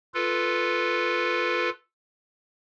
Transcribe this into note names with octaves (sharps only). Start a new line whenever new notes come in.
F4 A4 B4